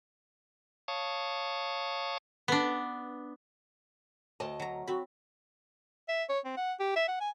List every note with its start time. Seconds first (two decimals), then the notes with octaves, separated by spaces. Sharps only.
0.88 C#5 F5 A5 C#6 D#6
2.48 B3 D4
4.40 D2 D#5 A5
4.60 F#3 A#5
4.87 C4 F#4 B5
6.09 E5
6.29 C#5
6.45 C4
6.57 F#5
6.80 G4
6.96 E5
7.08 F#5
7.21 G#5